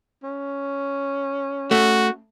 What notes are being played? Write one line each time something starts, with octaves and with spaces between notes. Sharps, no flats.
C#4
A3 F#4